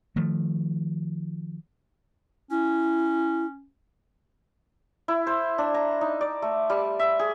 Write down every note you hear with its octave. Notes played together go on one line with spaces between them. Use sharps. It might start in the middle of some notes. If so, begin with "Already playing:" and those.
D#3 F3 A3
C#4 E4
E4
C5
D4
A#5
D#4
D5
A3
G3
E5
G#4